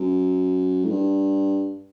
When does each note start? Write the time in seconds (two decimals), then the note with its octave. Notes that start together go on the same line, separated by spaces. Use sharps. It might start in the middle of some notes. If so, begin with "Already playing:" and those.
Already playing: F#2
0.84 A2
0.91 G2